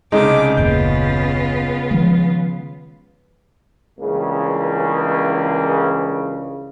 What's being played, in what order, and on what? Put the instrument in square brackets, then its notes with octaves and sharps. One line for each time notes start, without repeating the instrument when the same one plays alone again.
[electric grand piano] C2 C#3 D#4 [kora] G#3 [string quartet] D6
[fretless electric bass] F#1 D#2 A#2 [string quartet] C#3 B3 F4 [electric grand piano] G6
[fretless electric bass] D#3 F3 G#3
[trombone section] C#2 G2 C#3 E3 A#3